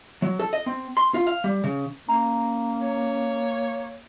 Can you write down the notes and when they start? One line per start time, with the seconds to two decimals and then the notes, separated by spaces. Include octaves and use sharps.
0.22 F#3
0.39 A4
0.53 D#5
0.66 C4
0.97 C6
1.14 F4
1.27 F5
1.44 G3
1.64 C#3
2.09 A#3 C#4 A#5
2.80 C#5